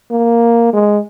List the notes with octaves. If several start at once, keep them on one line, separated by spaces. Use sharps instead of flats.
A#3
G#3